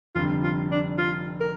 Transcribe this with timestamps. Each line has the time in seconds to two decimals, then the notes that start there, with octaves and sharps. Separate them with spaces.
0.15 F1 F2 D3 G3 F4
0.43 F4
0.71 D4
0.98 F4
1.40 A#4